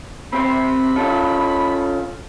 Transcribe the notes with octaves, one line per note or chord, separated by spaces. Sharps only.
C4 G4 C5 B5
C#4 F4 A4